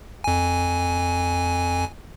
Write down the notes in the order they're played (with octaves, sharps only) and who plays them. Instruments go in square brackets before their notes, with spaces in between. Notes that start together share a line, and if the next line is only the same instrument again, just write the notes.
[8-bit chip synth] F2 G#5